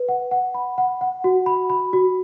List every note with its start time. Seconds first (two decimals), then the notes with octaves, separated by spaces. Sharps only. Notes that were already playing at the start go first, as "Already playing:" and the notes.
Already playing: B4
0.08 F#5
0.31 F#5
0.54 B5
0.78 F#5
1.01 F#5
1.24 F#4
1.46 B5
1.70 B5
1.93 F#4